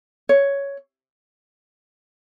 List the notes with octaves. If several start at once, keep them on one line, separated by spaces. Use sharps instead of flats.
C#5